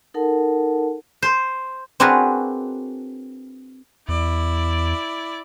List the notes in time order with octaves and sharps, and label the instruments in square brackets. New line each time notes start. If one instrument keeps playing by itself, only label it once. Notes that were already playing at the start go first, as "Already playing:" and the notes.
[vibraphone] D#4 A4 A#4 F#5 A5
[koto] C5
[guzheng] C4 D4 F#4 G#4 A#4 B4
[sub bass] E2 [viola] E4 D5